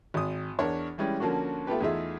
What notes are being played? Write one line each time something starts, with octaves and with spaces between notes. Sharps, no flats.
G#1 D#6
E2 D4 A#4 C#5
E3 G3 G#3 C#4
D3 F3 A#3 C#4 D4 F#4
A3 B3 F4 G4 B4
E2 A3 D#4 F4 G#4 E5